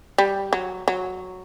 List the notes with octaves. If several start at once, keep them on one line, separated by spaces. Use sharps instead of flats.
G3
F#3
F#3